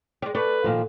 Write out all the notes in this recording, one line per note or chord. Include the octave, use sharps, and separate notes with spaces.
G3 G#3 D5
A3 B4 D5
A#2 D#3 F3